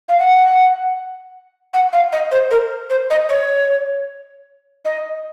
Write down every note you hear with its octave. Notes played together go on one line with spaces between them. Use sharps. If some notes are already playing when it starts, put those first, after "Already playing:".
F5
F#5
F#5
F5
D#5
C5
A#4
C5
D#5
C#5
D#5